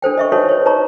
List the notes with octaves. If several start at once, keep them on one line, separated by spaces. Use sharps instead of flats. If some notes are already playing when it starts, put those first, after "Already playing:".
D4 A4 C5 G5
D#5 E5 C#6
D#4 F#4 A4 B4 C#5 D#5
C5 C#5
D#4 B4 C#5 A#5 C#6